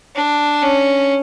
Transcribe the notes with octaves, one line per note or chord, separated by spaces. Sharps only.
D4
C#4